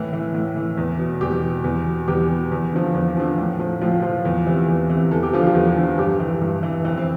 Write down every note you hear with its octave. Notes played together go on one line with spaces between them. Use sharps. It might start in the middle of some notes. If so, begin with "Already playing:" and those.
Already playing: A2 E3 E4
E3
A2
E3
E2
B2
E2 G3 G4
B2
E2
B2
E2 G3 G4
B2
E2
D3 F3
E2
D3 F3
A2
F3
A2 F3 F4
F3 F4
E2
C3 E3
E2
C3 E3
E2 A4
G4
D3 F3 F4
G3 G4
E2
D3 F3
G2 G3 G4
E3
G2
E3
F2 E3 E4
C4